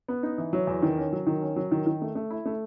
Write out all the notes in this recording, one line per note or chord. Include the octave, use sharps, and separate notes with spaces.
B3
D#4
E3
F#3
E2
D#3
C#4
F#3
D#3
C#4
F#3
D#3
D#3
A3
A3
E4
A3